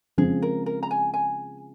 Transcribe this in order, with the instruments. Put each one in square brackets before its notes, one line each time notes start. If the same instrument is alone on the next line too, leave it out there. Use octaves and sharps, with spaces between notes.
[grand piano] C#3 F3 G#3 C4 [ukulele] G#4
[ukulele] A#4
A#4
A#5
G#5
G#5